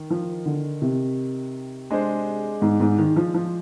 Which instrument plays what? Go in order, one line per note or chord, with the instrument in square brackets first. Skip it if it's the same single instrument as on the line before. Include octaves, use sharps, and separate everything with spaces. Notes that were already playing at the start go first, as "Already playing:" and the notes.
Already playing: [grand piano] D#3
[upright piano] F3
D3
C3
[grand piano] G#3 D4 G#4 C5
[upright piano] G#2
G#2
D#3
F3
F3